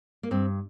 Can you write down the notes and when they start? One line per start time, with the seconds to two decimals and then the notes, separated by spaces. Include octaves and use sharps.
0.23 A#3
0.31 G2 C4